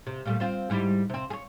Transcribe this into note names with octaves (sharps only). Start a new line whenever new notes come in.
C3
A#2 G3 A3
C4 F4 C5
G#2 G3 E4
C3 C4
G#4 C#5